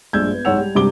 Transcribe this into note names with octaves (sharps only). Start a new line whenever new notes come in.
A#1 G2 G#3 E6 G6 G#6
B3
C2 G#2 C#5 F#5 E6 F7
G3
G#1 G2 C3 G3 D6 G7